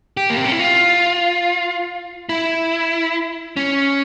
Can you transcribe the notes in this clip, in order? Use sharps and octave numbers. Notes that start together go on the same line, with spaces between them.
G4
A#3
C4
C#4
E4
F4
E4
C#4